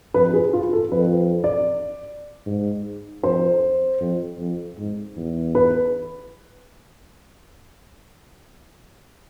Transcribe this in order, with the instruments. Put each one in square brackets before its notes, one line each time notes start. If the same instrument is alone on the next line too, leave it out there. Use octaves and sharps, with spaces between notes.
[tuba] F2 [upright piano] B4
[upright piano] G#4
F4
A4
[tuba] F2 [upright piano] B4
[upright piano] D5
[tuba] G#2
[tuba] F2 [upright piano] C5
[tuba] F2
F2
G#2
E2
[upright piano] B4